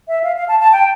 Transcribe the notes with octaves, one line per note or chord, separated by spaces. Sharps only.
E5
F5
F5
A5
A5
G5